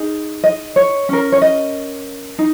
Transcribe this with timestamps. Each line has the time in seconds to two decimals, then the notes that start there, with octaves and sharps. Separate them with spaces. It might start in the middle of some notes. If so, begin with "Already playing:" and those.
Already playing: D#4 G#4
0.44 D#5
0.76 C#5
1.09 C#4 A#4
1.32 C#5
1.42 D#5
2.39 D#4